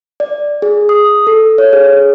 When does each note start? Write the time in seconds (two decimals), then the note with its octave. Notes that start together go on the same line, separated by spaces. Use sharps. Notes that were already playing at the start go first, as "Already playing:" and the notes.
0.20 D5
0.62 G#4
0.89 D#6
1.27 A4
1.58 C#5
1.73 G#4